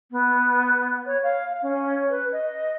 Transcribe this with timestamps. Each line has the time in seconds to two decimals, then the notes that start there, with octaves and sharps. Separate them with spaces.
0.11 B3
1.06 C#5
1.23 F5
1.62 C#4
2.10 B4
2.32 D#5